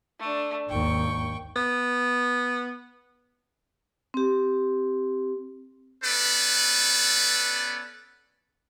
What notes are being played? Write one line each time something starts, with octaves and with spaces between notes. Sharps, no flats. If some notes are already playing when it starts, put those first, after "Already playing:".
A3 D4
G#1 D#2 G5 C#6
B3
C4 G4
B3 C#4 A4 B4 D5